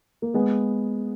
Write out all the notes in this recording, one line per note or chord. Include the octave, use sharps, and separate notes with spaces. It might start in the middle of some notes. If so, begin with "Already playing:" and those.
A#3
G#3 B3